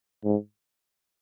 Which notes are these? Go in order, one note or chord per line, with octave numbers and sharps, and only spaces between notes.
G#2